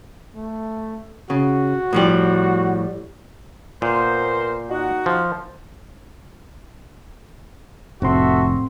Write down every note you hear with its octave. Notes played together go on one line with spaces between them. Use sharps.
A3
C#3 F#4
A2 F3 G3
A#2 B3 A#4 C5
D#4 F#4 F#5
F3
F1 A2 C4 F#4 A4 E5 C6